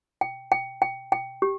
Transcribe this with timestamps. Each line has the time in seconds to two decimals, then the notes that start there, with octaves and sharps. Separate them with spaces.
0.21 G5
0.52 G5
0.82 G5
1.12 G5
1.42 G4